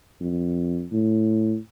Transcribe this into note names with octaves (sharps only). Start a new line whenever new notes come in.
F2
A2